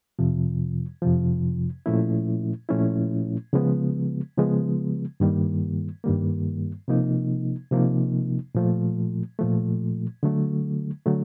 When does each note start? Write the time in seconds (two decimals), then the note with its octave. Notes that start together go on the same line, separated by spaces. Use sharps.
0.19 F2 C3 F3
1.02 F2 C3 F3
1.86 A#2 F3 A3 C#4 E4
2.69 A#2 F3 A3 C#4 E4
3.53 C#3 F3 G#3 B3
4.37 C#3 F3 G#3 B3
5.20 G2 D#3 G3 A#3
6.04 G2 D#3 G3 A#3
6.88 C3 F3 A#3 D#4
7.71 C3 F3 A#3 D#4
8.55 A#2 F3 A3
9.39 A#2 F3 A3
10.23 D3 F#3 A3
11.06 D3 F#3 A3